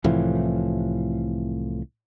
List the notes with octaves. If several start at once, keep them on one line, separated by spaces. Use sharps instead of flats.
C2 A2 E3 F3